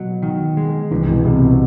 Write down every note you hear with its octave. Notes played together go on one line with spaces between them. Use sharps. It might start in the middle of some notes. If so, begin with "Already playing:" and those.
Already playing: B2 F#3
D#3
G#3
C2 E3
B2
C2 C3
B2